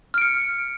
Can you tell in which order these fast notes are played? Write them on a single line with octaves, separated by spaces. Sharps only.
F6 D7 C#7